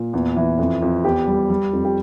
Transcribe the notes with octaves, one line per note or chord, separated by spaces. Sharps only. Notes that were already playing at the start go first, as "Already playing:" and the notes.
Already playing: A#2
E2
E3
F2
F2
E2 G4
G3
G3
F2
G4